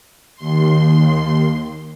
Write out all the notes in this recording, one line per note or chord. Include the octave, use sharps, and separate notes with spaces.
D#2 C6